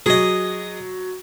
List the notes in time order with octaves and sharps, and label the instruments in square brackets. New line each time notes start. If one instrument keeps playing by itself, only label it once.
[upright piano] F#3 [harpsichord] G#4 D#5